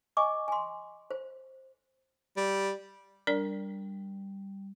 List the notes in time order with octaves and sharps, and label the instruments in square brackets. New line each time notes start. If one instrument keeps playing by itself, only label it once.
[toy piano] D#5 G#5 C#6 D6
G#5 C6
C5
[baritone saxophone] G3
[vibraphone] G3 [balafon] D4 A#4 D5